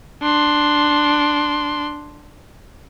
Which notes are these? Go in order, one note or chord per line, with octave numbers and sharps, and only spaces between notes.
D4 C6